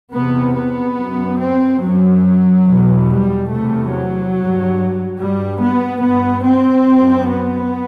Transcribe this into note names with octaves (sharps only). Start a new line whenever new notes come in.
E2 C3 B3
B3
F#2
C4
F#2 F#3
E2 B2
G3
E2 C3 A3
F#3
G2
G2 G3
B3
G2 B3
C4
F#2
B3